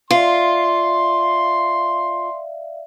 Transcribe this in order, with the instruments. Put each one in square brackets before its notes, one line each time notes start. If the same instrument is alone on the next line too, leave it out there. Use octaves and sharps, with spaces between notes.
[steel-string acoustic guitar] F4 [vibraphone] D5 E5 F5 [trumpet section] C6